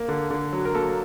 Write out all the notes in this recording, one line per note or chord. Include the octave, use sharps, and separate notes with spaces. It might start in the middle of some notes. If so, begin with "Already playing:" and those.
Already playing: A#3
D3
D3
F#3
A#4
A#3 A4